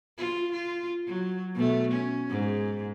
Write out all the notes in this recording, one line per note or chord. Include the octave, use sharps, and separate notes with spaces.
F4
F4
F#3
B2 A3
C#4
G#2